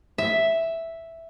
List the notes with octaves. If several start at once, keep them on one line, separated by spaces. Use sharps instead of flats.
E5